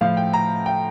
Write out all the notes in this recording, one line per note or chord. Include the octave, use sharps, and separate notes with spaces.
A2 F3 F5
G5
A#5
G5